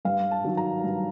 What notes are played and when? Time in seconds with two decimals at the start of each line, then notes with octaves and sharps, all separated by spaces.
0.05 G2 F5
0.31 A5
0.44 D#3 F#3
0.57 A#5
0.84 G2